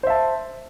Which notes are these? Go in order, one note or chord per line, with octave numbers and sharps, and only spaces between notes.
C5 E5 A5